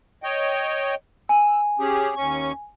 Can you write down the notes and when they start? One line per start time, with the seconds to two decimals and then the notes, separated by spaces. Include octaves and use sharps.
0.23 C#5 D#5 G5
1.29 G#5 E6
1.79 C#4 G4 G#4
2.16 D#2 C#4 C#6